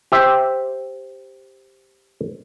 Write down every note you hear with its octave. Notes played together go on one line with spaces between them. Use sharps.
G4 C5 E5